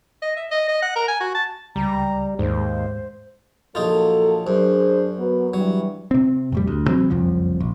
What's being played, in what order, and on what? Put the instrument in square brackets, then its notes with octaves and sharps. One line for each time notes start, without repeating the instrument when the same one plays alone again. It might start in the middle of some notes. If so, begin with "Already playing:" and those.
[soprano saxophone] D#5
E5
D#5
D#5
F#5
A#4
G#5
F#4
A5
[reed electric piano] C#2 [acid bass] G3 [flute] A#5
[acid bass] D#2 [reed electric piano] G#2 [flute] C5
[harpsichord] A#1 D#4 F4 [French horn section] F#3 A#3 A4
[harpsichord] F#2 [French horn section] D4 G#4 C5
[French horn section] F#3 B3
[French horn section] G2 E3 G3 [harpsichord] F#3
[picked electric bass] C3 C4
F2 A2 G3
D2
C3 E3 F#3 C4
F#1 C2 F2 F3
A#1